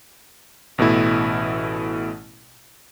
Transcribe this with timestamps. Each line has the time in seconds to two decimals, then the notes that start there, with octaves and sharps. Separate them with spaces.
0.78 A1 B2 A3 E4